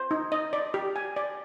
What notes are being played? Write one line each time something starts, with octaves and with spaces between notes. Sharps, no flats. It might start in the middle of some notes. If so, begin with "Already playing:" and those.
Already playing: C5
D#4
D#5
D5
G4
G#5
D5